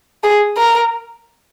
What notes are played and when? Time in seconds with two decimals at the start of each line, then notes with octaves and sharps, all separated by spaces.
0.24 G#4
0.57 A#4